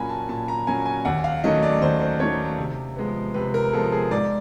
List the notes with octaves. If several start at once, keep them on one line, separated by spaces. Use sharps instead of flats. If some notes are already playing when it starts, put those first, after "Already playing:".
Already playing: A#2 F#3 A#3 C#4 G#5 A#5 B5
A5
A#2 A5
A#5
F#3 A#3 C#4 G#5
G#5
D#2 F#5
F5
D#3 F#3 A3 C#4 D#5
D5
D#2 C5
C5
D#3 F#3 A3 C#4 C#5
C3
F3 G#3 B3
C3 B4
A#4
F3 G#3 B3 A4
G#4
G#2 D5